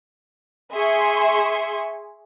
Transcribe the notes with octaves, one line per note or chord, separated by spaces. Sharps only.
G#4 E5 G#5 C6 C#6